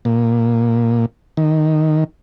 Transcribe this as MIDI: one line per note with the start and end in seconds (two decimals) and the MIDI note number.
0.05 1.06 46
1.37 2.04 51